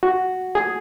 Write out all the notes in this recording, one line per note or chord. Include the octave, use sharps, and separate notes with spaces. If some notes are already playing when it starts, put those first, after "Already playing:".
F#4
G#4